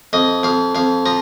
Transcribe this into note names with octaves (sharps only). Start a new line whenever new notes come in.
F2 D#5
F2 F5
F2 F5
F3 A#5